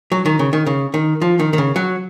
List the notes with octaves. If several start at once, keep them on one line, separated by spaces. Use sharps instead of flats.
F#3
D#3
C#3
D#3
C#3
D#3
F3
D#3
D#3
C#3
F#3